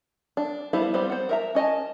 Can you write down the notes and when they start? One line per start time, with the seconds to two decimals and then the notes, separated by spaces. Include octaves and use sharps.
0.37 D4
0.73 G3 B3 E4 C5 F5
0.94 G3 B3 C4 C5
1.10 C5 F#5
1.29 A#4 E5 A#5
1.55 C#4 D#5 G#5 A5